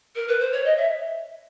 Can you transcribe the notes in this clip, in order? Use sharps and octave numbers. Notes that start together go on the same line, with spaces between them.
A#4
B4
C5
C#5
D#5
E5